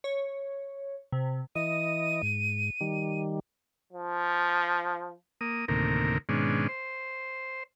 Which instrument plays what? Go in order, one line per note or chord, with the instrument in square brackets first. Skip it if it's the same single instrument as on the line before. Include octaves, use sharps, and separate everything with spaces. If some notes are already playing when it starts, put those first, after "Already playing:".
[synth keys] C#5
C3
[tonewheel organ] E3 D#5 [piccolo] D#7
[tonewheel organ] G#2
D#3 G3
[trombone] F3
[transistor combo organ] A#3 D#6
D2 A2 C3 D#3 A#3 A#4
G#2 B2 D#3 G#3 C#4 D4
C5